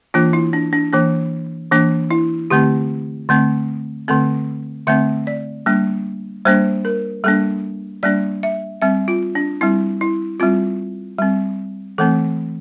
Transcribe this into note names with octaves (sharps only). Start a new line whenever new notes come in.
E3 A#3 D4 F4
E4
D4
D4
E3 A#3 D4
E3 A#3 D4
E4
D3 A3 C4 G4
D3 A3 C4
D3 A3 C4 A4
D3 A3 C4 E5
D5
G3 A#3 D4
G3 A#3 D4 C5
A#4
G3 A#3 D4 A4
G3 A#3 D4 D5
E5
G3 C4 E5
F4
D4
G3 C4 E4
E4
G3 C4 F4
G3 C4
E3 A3 C4 A4